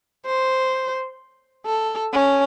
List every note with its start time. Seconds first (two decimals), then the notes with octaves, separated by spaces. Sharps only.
0.26 C5
1.65 A4
2.13 C#4